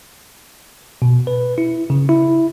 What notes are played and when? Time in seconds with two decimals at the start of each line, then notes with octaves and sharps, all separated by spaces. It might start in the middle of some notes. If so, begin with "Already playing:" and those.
1.02 B2
1.27 B4
1.58 E4
1.90 C#3
2.09 E4